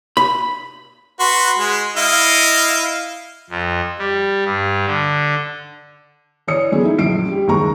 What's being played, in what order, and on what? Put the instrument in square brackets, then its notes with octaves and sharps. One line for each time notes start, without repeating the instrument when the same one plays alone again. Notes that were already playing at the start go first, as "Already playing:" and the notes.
[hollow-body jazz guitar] B5
[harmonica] F#4 B4 C6
G#3
E4 D#5 F5
[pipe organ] F2
G3
G2
D3
[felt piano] E3 C#5 D5 D#6 C#7
F#3 A3 B3 C#4 G#4
D#4 E4
A#1 F#2 C7 D7
G3
F#1 D#2 G#2 G#3 A#5 C#6